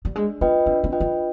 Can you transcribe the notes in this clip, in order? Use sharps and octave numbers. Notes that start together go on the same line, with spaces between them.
G3
G#3 D4
B3 F4 B4 D#5 G5
C4 D4
C4
F4 B4 D#5 G5
D4